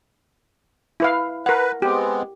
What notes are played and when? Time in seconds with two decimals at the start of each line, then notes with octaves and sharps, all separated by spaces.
1.00 E4 B4 F5
1.46 A#4 B4 F#5
1.82 G#3 B3 C4 G4